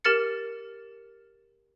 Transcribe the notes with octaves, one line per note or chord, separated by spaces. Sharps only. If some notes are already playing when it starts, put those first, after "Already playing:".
G4 A#4 F6 A6 C#7